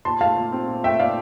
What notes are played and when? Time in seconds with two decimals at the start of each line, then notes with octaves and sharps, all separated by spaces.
0.05 A#2 A5 C6
0.21 A3 F5 A5
0.36 A#2
0.52 C4
0.68 A#2
0.84 A3 E5 G5
0.99 A#2 D5 F5